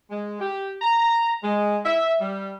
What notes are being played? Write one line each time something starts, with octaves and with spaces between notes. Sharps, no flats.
G#3
G4
A#5
G#3
E5
G3